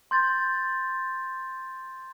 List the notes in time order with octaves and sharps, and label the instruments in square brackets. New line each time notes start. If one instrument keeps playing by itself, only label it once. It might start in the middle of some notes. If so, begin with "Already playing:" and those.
[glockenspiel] C6 G6 A6